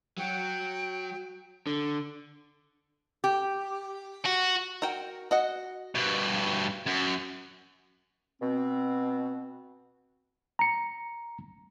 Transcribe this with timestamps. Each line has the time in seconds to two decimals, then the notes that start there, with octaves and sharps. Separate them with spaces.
0.18 F#3 F#4 G5
1.67 D3
3.24 G4
4.25 F#4
4.82 F#4 A#4 G5
5.31 F#4 D#5 F#5
5.95 G2 B2
6.86 F#2
8.42 B2 C4
10.59 A#5 C#7